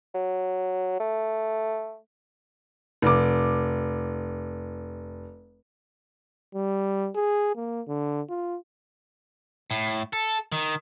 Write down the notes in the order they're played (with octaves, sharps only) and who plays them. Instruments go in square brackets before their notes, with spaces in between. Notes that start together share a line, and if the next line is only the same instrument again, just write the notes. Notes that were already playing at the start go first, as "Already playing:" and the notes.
[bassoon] F#3
A3
[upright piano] F1 D6
[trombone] G3
G#4
A#3
D3
F4
[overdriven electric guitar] A2
A4
D#3